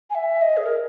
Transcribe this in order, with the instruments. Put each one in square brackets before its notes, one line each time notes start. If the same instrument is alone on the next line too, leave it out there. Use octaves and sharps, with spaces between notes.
[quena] G#5
E5
D#5
G#4
A#4